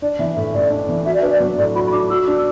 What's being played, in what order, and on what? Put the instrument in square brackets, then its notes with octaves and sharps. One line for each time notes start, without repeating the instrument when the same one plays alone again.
[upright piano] D4 [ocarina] D5
[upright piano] E3 [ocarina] E5
[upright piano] A2 [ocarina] E5
[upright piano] A1 [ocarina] D5
[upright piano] D4
E3
[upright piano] F#4 [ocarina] E5
[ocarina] D5
[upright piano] D4 [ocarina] B4
[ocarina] D5
[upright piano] F#3
[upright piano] A2 [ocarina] D5
[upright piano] F#4 [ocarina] B5
[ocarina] B5
[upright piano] D4 [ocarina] D6
[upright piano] F#4 [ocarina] E6
[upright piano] D4